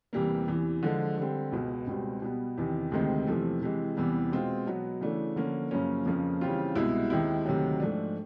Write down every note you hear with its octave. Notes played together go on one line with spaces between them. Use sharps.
E2 C3 E3 G3 A#3
E2 C3 E3
D3 F3 G#3
D3 G3 C4
C#2 B2 G#3
C#2 B2 G3 C4
B2 G3 B3
E2 C3 D#3
D2 C3 D#3 G#3 C4
E2 C3 F3 A3
C3 E3 G#3
E2 C3 E3 G3 B3
B2 G#3 C4 F4
B2 F#3 B3
C#3 E3 A3 D4
D3 F3 A#3 C#4
F#2 C#3 F3 A#3 C#4
F2 C#3 F3 A#3 C#4
C#3 E3 G3 C4 F4
C2 B2 G#3 B3 E4
D#2 D#3 G#3 C4 E4
D2 C3 D#3 F#3
G#2 F3 A3 D4